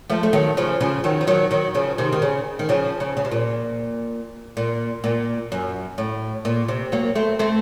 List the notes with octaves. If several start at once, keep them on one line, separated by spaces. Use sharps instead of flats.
F3 A3
A3
D#3 F#3
C#3 F3
C#3 F3
D#3 F#3
F3
D#3 F#3
D#3 F#3
C#3 F3
C3 D#3
D#3
C#3
D#3
C#3 F3
C#3
C#3
C3
A#2
A#2
A#2
F#2
A2
A#2
C3
F#3 A#3
A3 C4
A3 C4